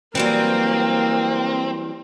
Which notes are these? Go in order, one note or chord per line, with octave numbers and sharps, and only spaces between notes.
E3 F#3 G3 A#3 C4